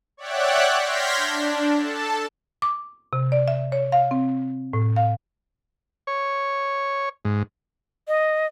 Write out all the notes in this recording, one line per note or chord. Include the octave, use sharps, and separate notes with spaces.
C#5 D5 E5 F#5 G5 F#6
C6 F6 G6 G#6 A#6 B6
D4
A4 A5
D6
C3
D5
E5
C#5
F5
C4
A2
F5
C#5
G#2
D#5